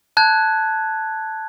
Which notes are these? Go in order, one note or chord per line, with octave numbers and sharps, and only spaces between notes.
A5 F#6 G#6